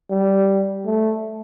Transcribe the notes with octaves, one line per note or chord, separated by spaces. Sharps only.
G3
A3